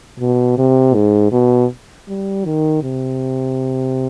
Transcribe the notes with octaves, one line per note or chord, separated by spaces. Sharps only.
B2
C3
G#2
B2
G3
D#3
C3